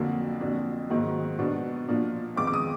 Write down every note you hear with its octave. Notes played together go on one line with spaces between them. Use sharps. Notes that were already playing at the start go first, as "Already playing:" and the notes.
Already playing: F2 D3 F#3 A#3 D4
F2 D3 F#3 A#3 D4
G#2 D#3 F#3 A#3
B2 F#3 B3 D4
A#2 F3 A#3 D4
F2 D#3 G#3 B3 D6
D6
D#6